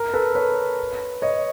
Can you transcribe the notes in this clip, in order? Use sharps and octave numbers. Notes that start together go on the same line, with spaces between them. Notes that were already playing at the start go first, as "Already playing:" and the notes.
Already playing: A#4
A4 B4
B4 C#5
C#5 D#5